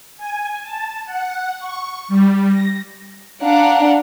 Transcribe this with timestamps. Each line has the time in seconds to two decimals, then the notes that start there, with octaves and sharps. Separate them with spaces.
0.17 G#5
0.62 A5
1.06 F#5
1.59 C#6
2.08 G3
2.48 A#6
3.43 D4 F5 F#5 A#5